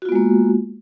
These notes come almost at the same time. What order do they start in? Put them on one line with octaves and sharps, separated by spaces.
F#4 F4 B3 G#3 A#3